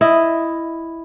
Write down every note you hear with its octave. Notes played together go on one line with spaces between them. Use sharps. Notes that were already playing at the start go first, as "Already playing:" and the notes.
E4 D#5